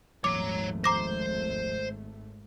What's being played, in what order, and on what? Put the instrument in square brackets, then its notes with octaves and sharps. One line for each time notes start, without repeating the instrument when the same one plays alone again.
[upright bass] D#1 F3 [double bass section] G#1 A3 [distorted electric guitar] C#5 A#5 [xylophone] D6
[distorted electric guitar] C5 C6 [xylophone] A#5 D6 A#6